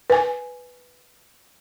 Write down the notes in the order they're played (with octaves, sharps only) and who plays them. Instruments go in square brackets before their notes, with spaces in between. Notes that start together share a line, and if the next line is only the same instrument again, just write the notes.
[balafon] B4 G#5